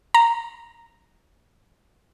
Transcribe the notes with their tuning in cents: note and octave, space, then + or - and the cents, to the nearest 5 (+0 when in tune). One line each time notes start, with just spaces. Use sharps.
A#5 -10